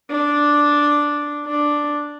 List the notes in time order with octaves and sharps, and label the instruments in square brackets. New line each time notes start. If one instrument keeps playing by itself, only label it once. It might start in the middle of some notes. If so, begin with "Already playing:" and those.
[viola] D4
D4